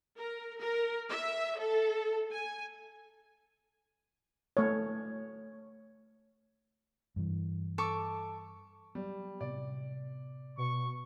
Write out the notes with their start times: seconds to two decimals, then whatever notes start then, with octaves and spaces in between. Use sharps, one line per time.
0.18 A#4
0.60 A#4
1.10 E5
1.59 A4
2.31 G#5
4.57 A3 C#5
7.16 G2 E3
7.78 A4 C#6 D6
8.95 F#3 G3 B3
9.41 A2 C3 B3 D5
10.57 B2 C#6